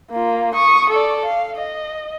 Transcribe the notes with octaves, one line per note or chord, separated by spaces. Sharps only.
A#3 F4
C#6 D#6
A4 D5
F5
D#5